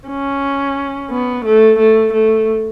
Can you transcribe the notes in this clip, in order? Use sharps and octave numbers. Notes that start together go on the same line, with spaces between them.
C#4
B3
A3
A3
A3